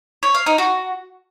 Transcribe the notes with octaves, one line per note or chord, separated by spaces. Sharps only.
C#5
F5
D#4
F#4